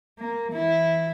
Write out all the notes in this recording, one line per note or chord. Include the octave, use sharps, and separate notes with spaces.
A#3
E3 E4